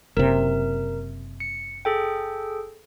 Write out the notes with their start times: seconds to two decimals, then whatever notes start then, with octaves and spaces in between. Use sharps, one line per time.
0.17 F#1 C3 A#4
1.40 C#7
1.85 G#4 A4 G5